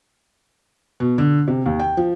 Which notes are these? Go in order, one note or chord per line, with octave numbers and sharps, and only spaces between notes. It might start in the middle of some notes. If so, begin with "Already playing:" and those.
B2
D3
C3
D#2
G5
F3